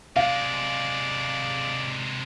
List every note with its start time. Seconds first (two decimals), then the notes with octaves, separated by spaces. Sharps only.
0.16 C3 G#3 D5 F5